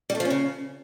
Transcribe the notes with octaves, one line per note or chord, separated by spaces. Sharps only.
G3
A3
F3
C#4
C#3